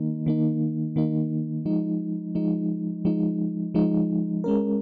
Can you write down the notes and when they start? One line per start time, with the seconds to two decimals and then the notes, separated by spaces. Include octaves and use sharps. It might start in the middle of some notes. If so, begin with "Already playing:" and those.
Already playing: D#3 A#3 D#4
0.26 D#3 A#3 D#4
0.96 D#3 A#3 D#4
1.66 F3 G#3 D#4
2.35 F3 G#3 D#4
3.05 F3 G#3 D#4
3.74 F3 G#3 D#4
4.44 G#3 C#4 A#4